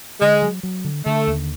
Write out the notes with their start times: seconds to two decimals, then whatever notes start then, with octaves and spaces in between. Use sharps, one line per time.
0.21 D3 G#3
0.42 F#3
0.63 F#3
0.84 D3
1.05 D3 A3
1.27 D#2